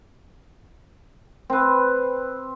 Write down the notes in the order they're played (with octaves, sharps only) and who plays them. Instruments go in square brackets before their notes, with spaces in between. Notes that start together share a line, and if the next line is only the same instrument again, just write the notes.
[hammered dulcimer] C4 B4